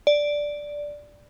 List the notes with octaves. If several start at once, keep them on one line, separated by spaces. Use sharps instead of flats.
D5